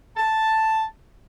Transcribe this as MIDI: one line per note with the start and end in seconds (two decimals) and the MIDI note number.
0.17 0.85 81